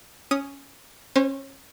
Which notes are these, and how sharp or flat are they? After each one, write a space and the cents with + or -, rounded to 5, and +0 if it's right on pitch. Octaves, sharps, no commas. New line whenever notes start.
C#4 +5 D#6 +0
C#4 -25 C5 +0